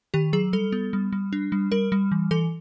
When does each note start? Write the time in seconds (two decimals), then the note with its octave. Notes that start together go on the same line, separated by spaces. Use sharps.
0.14 D#3 G4
0.33 F#3 G#4
0.53 G3 A4
0.72 B3
0.93 G3
1.13 G3
1.33 D4
1.52 G3
1.72 G3 A#4
1.92 G3
2.12 E3
2.31 E3 A4